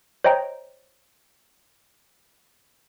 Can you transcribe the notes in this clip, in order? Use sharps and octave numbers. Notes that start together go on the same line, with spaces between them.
C5 C#5 D#5 G5 A#5